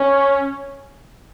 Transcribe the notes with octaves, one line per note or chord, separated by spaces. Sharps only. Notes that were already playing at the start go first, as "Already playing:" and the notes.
Already playing: C#4